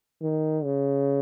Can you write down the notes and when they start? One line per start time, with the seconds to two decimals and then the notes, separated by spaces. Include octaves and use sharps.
0.22 D#3
0.64 C#3